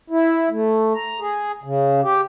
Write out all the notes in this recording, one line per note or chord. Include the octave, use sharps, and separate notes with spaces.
E4
A3
A#5
G#4
C#3
G4